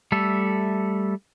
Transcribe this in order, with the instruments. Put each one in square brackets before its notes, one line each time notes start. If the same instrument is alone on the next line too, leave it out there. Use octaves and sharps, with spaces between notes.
[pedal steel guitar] G3 A3 A4 E5